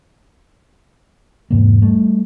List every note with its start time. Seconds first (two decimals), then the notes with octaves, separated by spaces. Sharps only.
1.50 E2 G#2 C3 A#3
1.82 G3 A3